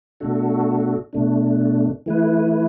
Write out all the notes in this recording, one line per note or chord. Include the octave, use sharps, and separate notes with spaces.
B2 A3 D4 F#4 A4
B2 A3 D4
E3 A3 E4 B4